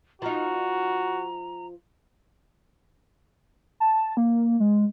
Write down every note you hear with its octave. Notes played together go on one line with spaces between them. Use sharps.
F3 D#4 F#4 A#5
A5
A#3
G#3